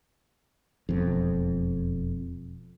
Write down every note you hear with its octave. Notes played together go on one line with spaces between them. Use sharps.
E1 F2